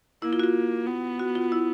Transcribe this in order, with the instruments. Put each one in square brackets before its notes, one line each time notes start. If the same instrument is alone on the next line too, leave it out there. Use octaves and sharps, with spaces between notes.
[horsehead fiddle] A#3 [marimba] E4
[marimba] F4
F#4
F4
[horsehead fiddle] B3
[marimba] F#4
F4
E4